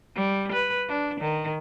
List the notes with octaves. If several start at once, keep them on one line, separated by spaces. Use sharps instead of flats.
G3
B4
D4
D#3